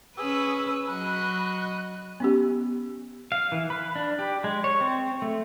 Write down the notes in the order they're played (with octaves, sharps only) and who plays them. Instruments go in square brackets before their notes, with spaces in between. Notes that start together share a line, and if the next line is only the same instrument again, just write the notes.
[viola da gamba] C#4 B4 [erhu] G#4 [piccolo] E6
[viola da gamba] F#3 F#4 D#5 [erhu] B5 [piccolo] F#6
[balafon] B3 C#4 G4
[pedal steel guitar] F5
E3
B4
D4
G4
G#3
C#5
C4
A3